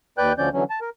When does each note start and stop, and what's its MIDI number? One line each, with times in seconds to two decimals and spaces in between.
0.18 0.33 39
0.18 0.33 71
0.18 0.33 74
0.18 0.33 79
0.18 0.33 90
0.18 0.33 91
0.38 0.49 38
0.38 0.49 50
0.38 0.49 53
0.38 0.49 61
0.38 0.49 74
0.38 0.49 91
0.53 0.64 50
0.53 0.64 52
0.53 0.64 54
0.53 0.64 61
0.70 0.80 81
0.81 0.90 70